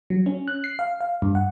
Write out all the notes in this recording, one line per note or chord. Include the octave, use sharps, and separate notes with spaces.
F#3
C#4
F#6
C7
F5
F5
G2
F#5